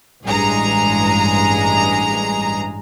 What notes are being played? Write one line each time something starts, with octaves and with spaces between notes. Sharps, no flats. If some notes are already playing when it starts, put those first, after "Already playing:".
A1 G2 G#3 G#4 A#5